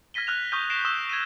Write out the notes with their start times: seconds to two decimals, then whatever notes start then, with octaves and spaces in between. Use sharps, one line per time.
0.14 F6 G#6 A#6 B6 D#7 G7
0.27 F6 F#6 F7
0.52 C#6 D#6 F6 G6 D#7
0.70 A#6 C7 D7 E7 G7
0.85 C#6 D#6 E6 E7 G7
1.09 G#6 D#7